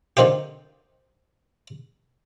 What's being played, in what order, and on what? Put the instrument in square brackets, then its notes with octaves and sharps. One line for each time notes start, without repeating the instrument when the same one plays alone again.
[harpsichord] D3 D#3 C4 F4 G4